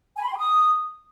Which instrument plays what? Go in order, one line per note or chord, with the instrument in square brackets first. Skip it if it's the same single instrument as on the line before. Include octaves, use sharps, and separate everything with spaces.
[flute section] G#5
B5
C6
G5
D#6